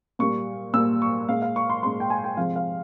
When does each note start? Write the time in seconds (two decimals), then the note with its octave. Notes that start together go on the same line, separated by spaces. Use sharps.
0.19 A#2 G3 A#3 C#6
0.74 A#2 G3 A#3 E6
1.02 C#6
1.28 A#2 G#3 F5
1.42 F5
1.56 C#6
1.70 C6
1.83 A#2 G#3 C6
2.00 G5
2.10 G#5
2.24 G5
2.37 C3 F3 G#3 F5
2.56 F5